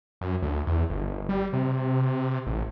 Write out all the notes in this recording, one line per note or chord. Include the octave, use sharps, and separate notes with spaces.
F#2
D2
E2
G1
G3
C3
A1